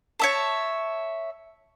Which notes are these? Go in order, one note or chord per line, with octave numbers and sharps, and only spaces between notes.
C#5 E5 A5